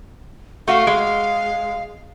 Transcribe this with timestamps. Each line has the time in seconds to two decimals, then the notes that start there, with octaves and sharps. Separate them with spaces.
0.68 A3 F#4 F5
0.87 G#3